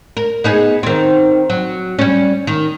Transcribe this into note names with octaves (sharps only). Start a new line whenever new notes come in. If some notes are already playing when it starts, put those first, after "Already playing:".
A#4
B3 D#4 G#4
D#3 C4
F#3
G3 C#4
D#3